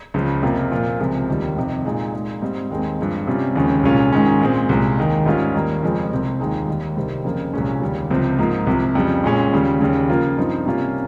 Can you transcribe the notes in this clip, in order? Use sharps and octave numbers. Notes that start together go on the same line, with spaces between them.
C#2 C#3 F3
F2 C3 F3 A#3 F4
A#2 F3 A#3 F4
C#2 C3 F3 G#3
D#2 D#3 G3
F2 C3 D#3
A#2 G#3 D#4
A#2 G#3 D#4
G#2 G3 C4
D#2 D#3 G#3 C4
G2 F3 G#3
C3 G3 C#4 F4
D#2 C#3 F3 G#3 C#4
C2 A#2 G#3 C#4 F4
G#2 D#3 G#3 C#4
A#2 G#3 C4
C2 A#2 G#3
D#2 D#3 G#3
G#2 G3 C#4 F4
D#2 D#3 G3 A#3
F2 C#3 F3 G#3 C#4
C2 C3 F3 C4
D#2 D#3 G#3 D#4
D#2 D#3 G3
C2 C3 D#3 G3 C4
F2 C#3 F3 A#3 F4
C2 A#2 F3 G#3 C#4
D#2 C#3 G3
C#2 C3 F3 C4
G#2 F3 A#3
C2 C3 F3
F2 C#3 G3
A#2 G#3 C#4
D#2 C#3 G3
D#2 C#3 G3
C#3 F3 A#3 F4
G2 F3 C4 D#4
C3 G3 A#3 C#4 F4